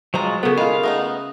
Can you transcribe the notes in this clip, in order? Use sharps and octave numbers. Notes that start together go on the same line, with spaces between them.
F#3 G#3 C4 F4 C5 A#5
C#3 B3 F#4 A4 A#4
G#3 F4 A#4 F5 B5
A3 B3 D#4 D#6 A#6